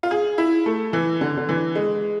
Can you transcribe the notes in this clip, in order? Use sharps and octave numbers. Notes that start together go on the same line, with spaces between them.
F4
G#4
E4
A3
E3
D3
D3
E3
G#3